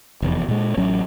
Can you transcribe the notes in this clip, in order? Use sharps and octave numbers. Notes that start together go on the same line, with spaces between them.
F1 E2
A#2 G#3
A1 F#3 C#4